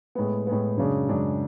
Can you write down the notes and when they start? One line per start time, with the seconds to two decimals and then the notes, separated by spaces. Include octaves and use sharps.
0.15 A2 G#3 B3
0.47 A2 G#3 B3
0.77 F#2 C#3 G#3 D4
1.09 F#2 C#3 G#3 D4